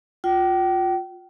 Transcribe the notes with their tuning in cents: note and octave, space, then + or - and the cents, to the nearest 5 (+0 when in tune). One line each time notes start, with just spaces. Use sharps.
F4 +20 G5 -35